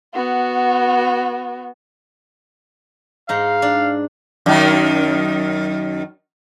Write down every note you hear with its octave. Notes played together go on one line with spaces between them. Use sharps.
B3 F#4
G#2 D#4 F5
D4
F#2 D#3